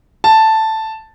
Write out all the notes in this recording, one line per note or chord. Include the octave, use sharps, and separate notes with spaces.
A5